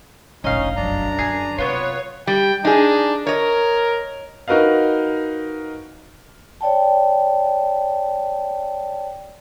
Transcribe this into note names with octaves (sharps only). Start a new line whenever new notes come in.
F1 A#1 C#4 D#4 D#5 F5
F#2 D4 A#5
D3 G#4
C3 B3 F4 B4 C#5
G3 G5
D4 D#4 G#4
A#4 C#5 D#5
D#4 F#4 A#4 B4 D#5 F5
C#5 D5 G5 A5